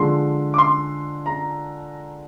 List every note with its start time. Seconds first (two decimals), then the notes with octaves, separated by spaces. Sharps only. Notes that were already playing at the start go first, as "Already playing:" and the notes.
Already playing: D3 F3 G#3 C6
0.54 D6
0.58 C6
1.26 A#5